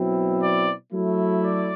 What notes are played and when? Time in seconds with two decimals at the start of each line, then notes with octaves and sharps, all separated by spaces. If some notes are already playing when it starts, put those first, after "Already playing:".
Already playing: B2 F#3 C4 E4
0.42 D5
0.93 F#3 A3 E4
1.45 D5